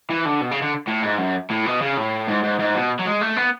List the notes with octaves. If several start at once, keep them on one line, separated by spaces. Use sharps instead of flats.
E3
D3
B2
C#3
D3
A2
G#2
F#2
A2
B2
C#3
A2
G#2
G#2
G#2
B2
F#3
G#3
A3
B3